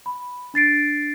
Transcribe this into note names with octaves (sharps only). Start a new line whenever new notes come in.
B5
D4 A6 C7 D7